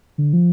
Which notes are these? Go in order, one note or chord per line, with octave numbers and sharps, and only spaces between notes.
D3
F3